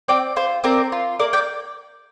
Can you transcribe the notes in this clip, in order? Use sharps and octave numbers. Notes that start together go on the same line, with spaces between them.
C4 D5 G5
F4 C5
C4 A#4 D5
F4
A#3 A#4 D5
D5 G5